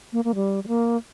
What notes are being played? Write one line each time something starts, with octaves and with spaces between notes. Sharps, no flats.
A#3
A#3
G3
G3
A#3